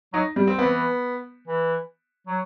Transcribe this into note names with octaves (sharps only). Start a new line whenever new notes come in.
F#3 D#4
G3
C4
E3 B3
E3
F#3